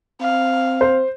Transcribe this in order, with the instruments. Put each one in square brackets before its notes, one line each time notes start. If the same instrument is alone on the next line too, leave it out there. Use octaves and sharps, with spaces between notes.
[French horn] C4 [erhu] F5
[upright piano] C5